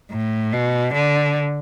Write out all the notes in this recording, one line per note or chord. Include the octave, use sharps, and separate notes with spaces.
A2
B2
D3